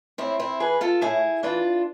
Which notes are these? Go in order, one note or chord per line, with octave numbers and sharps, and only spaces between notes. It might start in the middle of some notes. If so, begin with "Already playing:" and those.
A2 C4 E4
C4 E4
E3 G#4 B4
F4 A4
A2 E4 G#4
E3 D4 F4